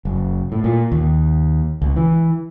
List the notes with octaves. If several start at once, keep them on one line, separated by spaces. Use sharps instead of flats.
F#1
A2
A#2
D#2
C#2
E3